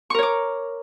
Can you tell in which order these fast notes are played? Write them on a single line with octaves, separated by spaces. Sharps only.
C#6 A#4 C#5 D6